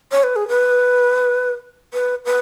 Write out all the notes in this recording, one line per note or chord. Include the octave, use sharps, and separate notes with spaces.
C#5
B4
G#4
B4
B4
B4